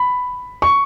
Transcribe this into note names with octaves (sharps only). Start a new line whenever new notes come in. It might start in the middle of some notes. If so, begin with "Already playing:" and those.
Already playing: B5
C#6